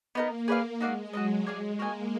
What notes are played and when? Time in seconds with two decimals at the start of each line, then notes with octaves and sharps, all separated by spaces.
0.15 A#3 B3 D#4 A#4
0.48 A#3 G#4 B4 D5 F5
0.81 G#3 D#4 F#4 D5 F5
1.13 F#3 F#4 B4 D#5
1.46 G#3 G#4 D5 F5 G#5
1.79 A#3 F#4 A#4 D#5 G#5